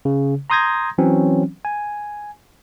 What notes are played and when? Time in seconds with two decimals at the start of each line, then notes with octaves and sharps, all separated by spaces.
0.05 C#3
0.50 A#5 C6 D#6 G6 G#6 A#6
0.98 E3 F#3 C4 C#4
1.65 G#5